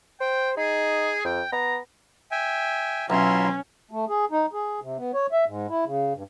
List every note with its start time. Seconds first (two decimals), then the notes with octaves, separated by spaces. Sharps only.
0.20 C5 G5
0.57 D#4 G#4
1.25 F2 G5
1.52 B3 A#5
2.31 E5 G5 G#5
3.10 B1 C#4 E4 F4 E5 A#5 C6
3.91 A3
4.09 G#4
4.31 D#4
4.53 G#4
4.81 C3
4.97 B3
5.14 C#5
5.32 E5
5.46 G#2
5.69 E4
5.85 C#3
6.15 G2